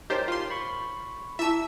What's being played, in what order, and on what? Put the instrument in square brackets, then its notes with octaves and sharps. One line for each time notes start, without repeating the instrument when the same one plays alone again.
[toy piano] D#4 C#5 D#5 [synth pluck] G4 C5 [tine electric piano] A#4
[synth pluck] F4 C6
[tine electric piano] B5 C#6
[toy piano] E4 G#4 A5 [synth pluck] E5 E6